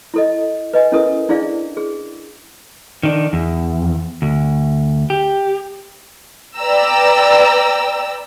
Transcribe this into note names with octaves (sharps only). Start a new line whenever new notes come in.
E4 A4 D#5
B4 D#5 G#5
C#4 E4 A4 A#4 D#6
D4 E4 G#4 D5 F5
G#4
D#3 D4
E2
D2
G4
B4 D5 G5 A#5 E6